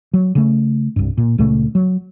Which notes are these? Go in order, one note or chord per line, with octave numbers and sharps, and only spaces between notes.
F#3
C#3 A3
C2 G2
A#2
C#2 A#2 C#3 A3
F#3